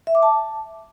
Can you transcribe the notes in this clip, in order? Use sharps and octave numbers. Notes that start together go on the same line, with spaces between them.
E5
D6
A5